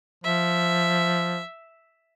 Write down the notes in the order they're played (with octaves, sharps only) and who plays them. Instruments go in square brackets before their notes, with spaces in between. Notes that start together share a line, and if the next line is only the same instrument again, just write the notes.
[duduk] F3 [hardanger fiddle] E5